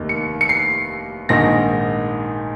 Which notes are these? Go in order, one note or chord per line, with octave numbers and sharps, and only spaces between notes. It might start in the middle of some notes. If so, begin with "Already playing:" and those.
Already playing: F1 D#2 D#3
C#7
C#7
C7
A#1 G#2 D#3 A#6